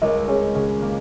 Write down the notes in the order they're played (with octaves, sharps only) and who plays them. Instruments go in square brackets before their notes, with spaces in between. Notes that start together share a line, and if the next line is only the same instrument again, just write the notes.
[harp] C#2 [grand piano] A#4 D#5
[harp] C#4 [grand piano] G#4 C#5
[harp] C#3 [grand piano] G#4
[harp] A#3